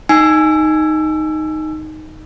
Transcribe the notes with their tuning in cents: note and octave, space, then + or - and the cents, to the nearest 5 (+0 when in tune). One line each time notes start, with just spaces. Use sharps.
D#4 +0 G#5 +0 E6 +20